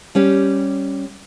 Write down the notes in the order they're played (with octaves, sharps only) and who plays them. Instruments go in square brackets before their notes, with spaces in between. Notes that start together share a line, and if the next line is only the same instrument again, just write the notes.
[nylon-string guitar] G3 C#4 G4